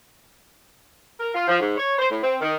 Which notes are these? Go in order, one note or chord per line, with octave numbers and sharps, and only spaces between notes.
A#4
F4
F3
G#2
C#5
C5
A2
C4
D#3